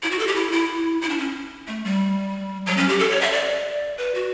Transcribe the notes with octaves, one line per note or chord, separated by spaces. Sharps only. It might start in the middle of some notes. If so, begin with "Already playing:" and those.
E4
F#4
A4
G4
E4
E4
E4
D4
C#4
A3
G3
F#3
C#4
G4
A4
C#5
E5
D5
B4
F#4